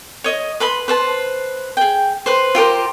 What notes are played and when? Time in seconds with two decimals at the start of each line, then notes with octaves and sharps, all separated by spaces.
0.24 C#5 D#5
0.60 B4 B5 C6
0.88 B4 C5 A5
1.77 G#4 G5
2.26 B4 C5
2.55 F4 G4 A#4 C5